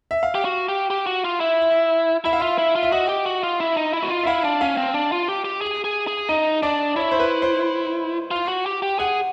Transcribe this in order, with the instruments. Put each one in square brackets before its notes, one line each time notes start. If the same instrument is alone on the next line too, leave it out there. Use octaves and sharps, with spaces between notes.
[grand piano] E5
F5
[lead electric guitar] G4
F#4
G4
G4
F#4
F4
E4
[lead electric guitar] E4 [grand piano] E5
[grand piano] F5
[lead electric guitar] F4 [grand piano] E5
[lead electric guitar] E4
F4
[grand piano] E5
[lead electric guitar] F#4 [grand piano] D#5
[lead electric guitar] G4
F#4
F4
E4
D#4
E4
F#4
F4
[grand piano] E5
[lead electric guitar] E4 [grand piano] F5
[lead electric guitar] D4
[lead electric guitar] C#4 [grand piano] F5
[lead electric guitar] C4
D4
F4
G4
G4
G#4
G#4
G#4
[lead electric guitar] D#4 [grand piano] D#5
[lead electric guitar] D4 [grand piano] D5
[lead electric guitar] E4 [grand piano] C#5
[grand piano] C5
B4
C5
[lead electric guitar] F4
F#4
G4
G4
[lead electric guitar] G#4 [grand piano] F#5